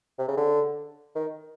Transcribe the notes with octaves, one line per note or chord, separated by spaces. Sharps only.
C3
C#3
D3
D#3